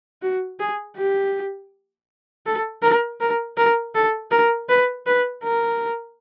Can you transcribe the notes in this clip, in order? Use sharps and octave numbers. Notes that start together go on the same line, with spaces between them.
F#4
G#4
G4
A4
A#4
A#4
A#4
A4
A#4
B4
B4
A#4